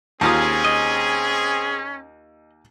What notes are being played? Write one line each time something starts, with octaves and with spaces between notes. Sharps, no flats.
D#2 C4 C#4 F4 G#4 D#6
D#5